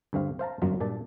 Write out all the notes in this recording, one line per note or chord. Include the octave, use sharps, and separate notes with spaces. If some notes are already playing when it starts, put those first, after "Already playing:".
D2 G2 C4 F5
C5 F5 A5 A#5
G1 F#2 F#3 A#3 F4
G2 A#2 D5 A5